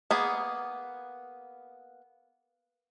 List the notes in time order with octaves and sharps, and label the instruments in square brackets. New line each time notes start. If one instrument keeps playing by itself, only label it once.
[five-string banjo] A#3 B3 G#4